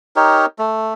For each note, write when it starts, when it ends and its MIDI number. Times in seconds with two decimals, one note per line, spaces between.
0.16 0.46 63
0.16 0.46 67
0.16 0.46 70
0.16 0.46 73
0.59 0.94 57